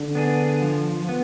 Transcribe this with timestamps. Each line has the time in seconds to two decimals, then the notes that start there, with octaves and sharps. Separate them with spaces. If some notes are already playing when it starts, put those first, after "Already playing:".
Already playing: D3
0.15 B3 D4 G#4
0.62 F3
1.09 B3